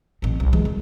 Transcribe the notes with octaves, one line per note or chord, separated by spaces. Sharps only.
A1 C4
C2
E3 G#3
C2